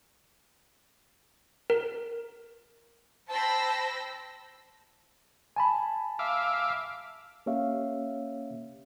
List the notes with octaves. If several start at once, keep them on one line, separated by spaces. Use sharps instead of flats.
A#4
C5 G5 A5 B5 E6 A#6
G#5 A5 B5
E5 F5 D6
A#3 C#4 G4 C#5 E5 F5